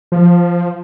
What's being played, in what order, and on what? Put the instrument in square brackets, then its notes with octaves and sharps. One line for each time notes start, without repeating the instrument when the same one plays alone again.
[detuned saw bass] F3